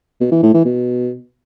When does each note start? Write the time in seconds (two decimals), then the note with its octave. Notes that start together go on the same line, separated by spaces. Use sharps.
0.20 B2
0.32 E3
0.43 A2
0.54 E3
0.65 B2